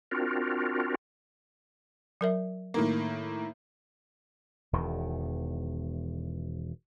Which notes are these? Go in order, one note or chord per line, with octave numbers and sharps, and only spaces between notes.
C4 D4 F4 F#4 A#4
F#3 A#4 E5
A2 D#3 A#3
E1 E2 D#3